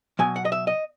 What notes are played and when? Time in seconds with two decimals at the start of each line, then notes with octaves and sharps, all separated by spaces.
0.19 B2 F#3 G#5
0.36 F#5
0.45 D#5
0.52 E5
0.67 D#5